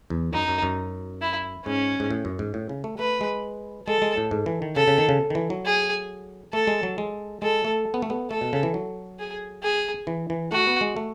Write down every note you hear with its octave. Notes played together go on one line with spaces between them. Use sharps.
E2
F#2 D#4
F#2
F#2
E4
G#2 C#4
G#2
A2
F#2
G#2
A2
C#3
A3
A3 B4
G#3
G#3 A4
G#3
A2
G#2
E3
D#3
C#3 A4
C#3
D#3
C#3
D#3
E3
F#3
G#4
A3 A4
G#3
F#3
G#3
G#3 A4
A3
B3
A3
B3
A3 A4
B2
C#3
E3
F#3
G#4
G#4
E3
E3
A3 F#4
B3
G#3
A3